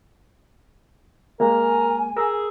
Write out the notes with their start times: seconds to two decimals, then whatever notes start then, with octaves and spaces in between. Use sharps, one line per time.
1.40 G#3 A#3 A#4 G#5
2.17 G#4 A#4 E6